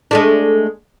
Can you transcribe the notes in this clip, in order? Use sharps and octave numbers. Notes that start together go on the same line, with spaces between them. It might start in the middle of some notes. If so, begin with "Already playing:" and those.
G#3 A3 D4